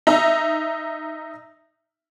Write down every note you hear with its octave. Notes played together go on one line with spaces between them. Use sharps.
D#4 E5 A#5